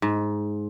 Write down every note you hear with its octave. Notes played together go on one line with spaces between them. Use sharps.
G#2